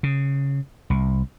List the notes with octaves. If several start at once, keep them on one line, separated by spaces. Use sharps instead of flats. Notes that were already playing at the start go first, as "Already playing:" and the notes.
C#3
C2